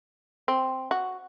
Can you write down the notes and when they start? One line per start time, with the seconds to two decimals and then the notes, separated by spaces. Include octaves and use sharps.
0.48 C4
0.91 F#4